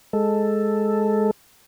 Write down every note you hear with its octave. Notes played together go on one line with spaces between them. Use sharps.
G#3 A4